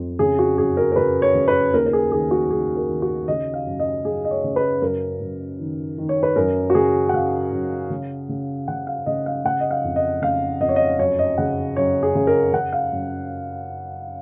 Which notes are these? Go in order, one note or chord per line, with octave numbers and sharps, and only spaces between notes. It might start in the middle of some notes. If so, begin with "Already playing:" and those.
Already playing: F2
C#3 G#4
F#4
F#2 G#4
A#4
A#4
C#3 B4
C#5
C#3
B4
D#2 A#4
A#4
G#4
D#3 G#4
F#4
D#3 G#4
A#4
D#3
F#4
C#3 D#5
F5
F#2
D#5
F#2 G#4
D#5
C#5
C#3
B4
F#2 A#4
F#2
D#3
D#3
C#5
B4
F#2 A#4
F#4
C#3 G#4
F#5
C#3 F5
F#2
C#3
C#3
C#3 F#5
F5
C#3 D#5
F5
C#3 F#5
D#5
F5
F2
D#5
C#3 F5
F2 D#5
C#5
D#5
F#2 C#5
D#5
C#3 F#5
F#2 C#5
G#4
C#3
A#4
C#3 F#5
F5
F#2